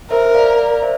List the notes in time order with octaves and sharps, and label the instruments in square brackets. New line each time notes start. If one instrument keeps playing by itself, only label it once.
[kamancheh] A#4 [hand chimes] C5 E5
[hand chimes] D5 F5
D5 F5
C5 E5